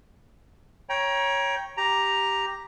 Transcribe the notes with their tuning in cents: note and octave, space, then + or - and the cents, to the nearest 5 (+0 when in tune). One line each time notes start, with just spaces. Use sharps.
C#5 +0 G5 +0 A#5 +30
G4 +0 A#5 +5